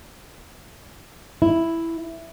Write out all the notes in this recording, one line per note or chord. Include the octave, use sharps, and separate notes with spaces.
E4